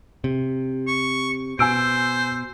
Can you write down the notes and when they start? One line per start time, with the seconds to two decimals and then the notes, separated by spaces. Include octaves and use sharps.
0.24 C3
0.87 C#6
1.59 B2 C5 G#5 E6 D7